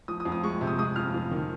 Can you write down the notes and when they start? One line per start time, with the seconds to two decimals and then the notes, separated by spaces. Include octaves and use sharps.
0.08 F3 D#6
0.20 D#6
0.25 F2
0.32 D#6
0.43 G#3 C#6
0.61 C3
0.67 D#6
0.78 G#3 D#6
0.96 F2 F6
1.14 F2
1.31 D#3